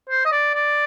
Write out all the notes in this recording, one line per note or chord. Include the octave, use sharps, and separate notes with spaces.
C5
D#5
D5
D5